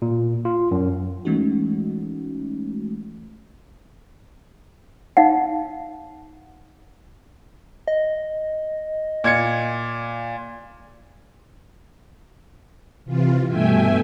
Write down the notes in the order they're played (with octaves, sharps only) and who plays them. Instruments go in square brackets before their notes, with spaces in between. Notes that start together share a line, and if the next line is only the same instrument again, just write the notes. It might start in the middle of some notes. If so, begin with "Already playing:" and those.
[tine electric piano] A#2
F4
F#2
[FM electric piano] E3 G#3 A3 C#4 D#4 F#4
[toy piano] D#4 F5 F#5
[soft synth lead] D#5
[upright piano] A#2 G#6 C#7
[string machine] C3 E3 F4
G2 B2 A3 E5 G5 G#5